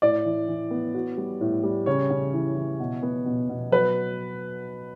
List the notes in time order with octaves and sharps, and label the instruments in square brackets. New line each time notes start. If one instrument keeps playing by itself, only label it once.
[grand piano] A2 [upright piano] D5
[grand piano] E3
E3
B3
F#4
G3
A2
G3
[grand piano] C#3 [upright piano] C#5
[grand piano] C#3
E3
E3
B2
B3
B2
B2
[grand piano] F#3 [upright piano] B4